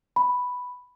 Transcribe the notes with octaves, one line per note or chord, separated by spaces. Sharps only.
B5